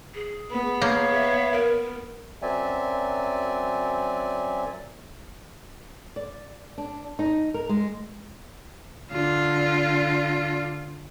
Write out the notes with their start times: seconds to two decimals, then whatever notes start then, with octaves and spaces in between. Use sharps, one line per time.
0.15 G#4
0.51 B3 B5
0.82 A#3 C#5 F5
1.14 E5
1.52 A#4
2.42 F#2 F#3 C4 D5 E5 G#5
6.16 D5
6.78 D4
7.19 D#4
7.54 A#4
7.69 G#3
9.12 D3 F4